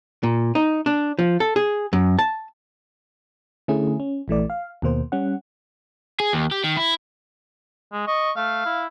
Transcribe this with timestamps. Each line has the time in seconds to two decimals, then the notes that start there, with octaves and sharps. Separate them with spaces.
0.23 A#2
0.55 D#4
0.86 D4
1.19 F3
1.40 A4
1.56 G#4
1.93 F#2
2.19 A5
3.68 D3 A3 C#4 E4 G#4
4.00 C#4
4.28 A#1 E3 A3 D5
4.50 F5
4.82 D#2 B2 A#3 C5
5.12 G3 C#4 F#5
6.20 G#4
6.33 D#2
6.51 G4
6.64 D#3
6.77 E4
7.93 G#3
8.07 D#5 C#6
8.37 A3 F5
8.65 E4